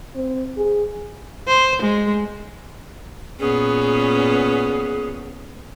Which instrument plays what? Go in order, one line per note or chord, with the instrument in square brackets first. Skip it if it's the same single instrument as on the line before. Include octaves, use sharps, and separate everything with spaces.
[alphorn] C4
G#4
[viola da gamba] C5
G#3
[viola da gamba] A#2 B3 C#4 [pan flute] G#4